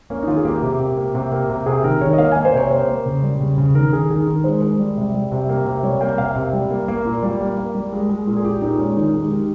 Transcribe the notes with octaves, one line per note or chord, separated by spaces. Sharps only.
A#3 C#4
D#4
D#3 F4
G#4
A#3 G4
C3
C3
A#3
C3
A#3
C3
C3 G#4
D#3 A#4
D#3 C#5
D#5
A#3 F5
A#3 G#5
C5
C3 C#5
A#3 C5
A#3
C#3
G3
C#3
C#3
D#3 A#4
D#3 G#4
D#3 G#4
D#3 A#4
G#3 C5
G#3
G3
C3
G3
C3
A#3
C3
G3 C#5
A#3 G5
C3 F5
C3
G3
A#3
A#3
A#2
G3
A#3
A#3
G3
G#3
G#3
A#2
G#4
A#2 G4
A#2 D#4
G#3 C#4
D#3 D#4
G#3
G4
D#3